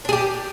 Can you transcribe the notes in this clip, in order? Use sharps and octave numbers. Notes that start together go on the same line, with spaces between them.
D4 G4 G#4